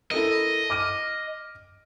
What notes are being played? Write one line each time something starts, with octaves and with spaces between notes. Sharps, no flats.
E4 A4 A#4 D#5
D6 F6 D#7